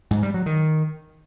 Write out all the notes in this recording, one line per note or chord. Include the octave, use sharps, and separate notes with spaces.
G#2
G3
F#3
D#3